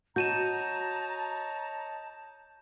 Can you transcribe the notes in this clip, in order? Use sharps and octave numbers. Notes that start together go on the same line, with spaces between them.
F#4 C#5 D#5 A5 A#5 G6 D#7 E7